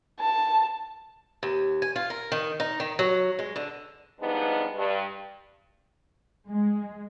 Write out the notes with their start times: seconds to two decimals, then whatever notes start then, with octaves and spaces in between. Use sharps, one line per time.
0.20 A5
1.43 D#2
1.82 G#5
1.96 F4
2.10 A#4
2.32 D#3
2.60 D#4
2.80 D#3
2.99 F#3
3.39 G#3
3.56 D3
4.20 F3 G3 G#3 B3 D4 D#4
4.76 G2
6.48 G#3